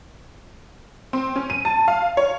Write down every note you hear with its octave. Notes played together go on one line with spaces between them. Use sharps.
C4
C#4
D#7
A5
F5
C#5